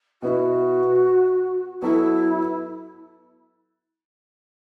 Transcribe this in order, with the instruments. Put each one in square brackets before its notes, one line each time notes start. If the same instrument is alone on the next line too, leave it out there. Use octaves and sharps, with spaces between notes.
[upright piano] B2 B3 E4 [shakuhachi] F#4
[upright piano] F#3 B3 F#4 A4 [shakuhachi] E4